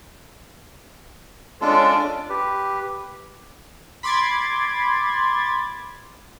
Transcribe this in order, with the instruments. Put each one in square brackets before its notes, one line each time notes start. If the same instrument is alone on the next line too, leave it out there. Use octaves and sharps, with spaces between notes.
[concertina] G#3 F4 A4 [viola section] C#4 D4 D5
[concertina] G4 B4
[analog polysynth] B5 C6 D6 G#6 A6